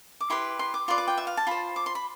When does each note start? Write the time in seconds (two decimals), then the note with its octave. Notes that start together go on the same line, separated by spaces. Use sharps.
0.20 D6
0.30 E4 G4 B4 C6
0.59 C6
0.74 D6
0.88 F4 B4 D5 C6
0.98 D6
1.08 G5
1.17 E5
1.27 F5
1.37 A5
1.47 F4 C5 B5
1.76 D6
1.86 C6
1.95 B5